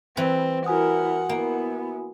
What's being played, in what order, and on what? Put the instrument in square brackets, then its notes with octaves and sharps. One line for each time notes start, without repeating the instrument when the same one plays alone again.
[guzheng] E3 G3 [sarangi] C4
[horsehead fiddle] E4 A#4 [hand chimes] F#4 G#5 D#6 [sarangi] F#5
[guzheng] A#3 [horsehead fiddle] B3 E4